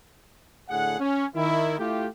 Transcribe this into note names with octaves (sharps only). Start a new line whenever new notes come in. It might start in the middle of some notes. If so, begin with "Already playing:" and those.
A2 D3 G#4 F#5
C#4
D#3 E4
A3 E4 F4 G4